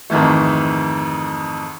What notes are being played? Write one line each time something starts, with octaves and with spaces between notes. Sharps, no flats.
F2 G#2 D#3 E3 A3